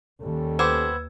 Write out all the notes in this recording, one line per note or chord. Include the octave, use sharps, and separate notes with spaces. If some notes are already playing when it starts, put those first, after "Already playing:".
D#2 G3 C#4 A4
B3 G4 B4 C5 E6 G#6